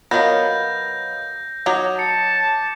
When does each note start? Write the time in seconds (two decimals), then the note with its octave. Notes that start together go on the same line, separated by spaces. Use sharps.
0.11 F#3 B3 A#4 D#5 F5 G6 A#6
1.66 F#3 D#4 D6
1.99 A5 C#7